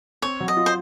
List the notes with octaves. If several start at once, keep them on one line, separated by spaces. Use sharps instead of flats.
C4 C#5
F#3
D#5
F4
C5